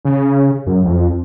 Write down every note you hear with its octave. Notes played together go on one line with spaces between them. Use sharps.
C#3
F#2
F2